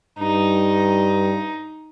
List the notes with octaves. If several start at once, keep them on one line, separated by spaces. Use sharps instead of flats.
G2 D#4